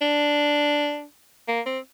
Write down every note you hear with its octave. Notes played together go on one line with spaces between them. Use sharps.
D4
A#3
C4